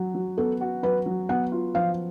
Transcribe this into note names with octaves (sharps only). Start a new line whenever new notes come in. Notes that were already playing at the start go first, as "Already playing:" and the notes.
Already playing: F#3 F#4
F#3
B3 A4
F#4
F#3 B4
F#3
B3 F#5
F4
F3 F5